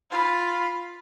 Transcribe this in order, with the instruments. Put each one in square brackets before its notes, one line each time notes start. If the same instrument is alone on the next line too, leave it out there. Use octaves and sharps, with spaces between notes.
[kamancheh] F4 B5